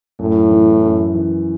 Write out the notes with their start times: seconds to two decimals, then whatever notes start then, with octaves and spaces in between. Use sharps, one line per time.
0.19 F#2 A2
0.51 E3
0.82 F#2
1.14 E3